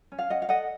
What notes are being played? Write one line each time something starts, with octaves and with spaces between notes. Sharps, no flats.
C#4
F5
C#4 D#5 F#5
F5
A4 D#5 F#5